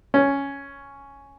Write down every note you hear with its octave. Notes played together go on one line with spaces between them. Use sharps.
C#4